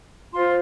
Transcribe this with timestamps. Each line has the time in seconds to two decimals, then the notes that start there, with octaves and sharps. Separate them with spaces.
0.31 F4 C5 C6